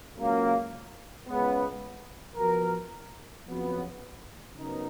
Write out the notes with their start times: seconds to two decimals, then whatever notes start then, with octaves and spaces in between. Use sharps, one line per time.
0.17 C#2 C#3 F#3 A#3
1.27 C#2 C#3 G#3 B3
2.36 F3 B3 F#4 A#4
3.46 F2 C#3 F#3 B3 F#4
4.55 C#3 F#3 B3 D#4 A#4